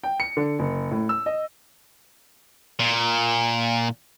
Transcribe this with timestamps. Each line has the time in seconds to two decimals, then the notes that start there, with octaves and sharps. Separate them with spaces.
0.03 G5
0.20 C#7
0.37 D3
0.59 F#1
0.91 A2
1.09 E6
1.26 D#5
2.80 A#2